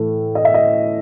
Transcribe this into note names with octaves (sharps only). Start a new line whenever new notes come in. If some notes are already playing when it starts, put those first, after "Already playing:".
Already playing: A2 E3 A3
D#5
E5
D#5